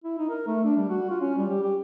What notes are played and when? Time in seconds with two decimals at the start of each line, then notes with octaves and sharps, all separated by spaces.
0.04 E4
0.18 D#4
0.30 A#4
0.47 A3
0.64 D4
0.77 G3
0.89 F#4
1.10 F4
1.21 C#4
1.38 G3
1.50 G4
1.63 G4